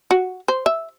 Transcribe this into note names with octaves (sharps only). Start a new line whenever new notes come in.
F#4
C5
E5